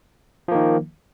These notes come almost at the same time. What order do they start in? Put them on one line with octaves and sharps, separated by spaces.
F3 A#3 D#3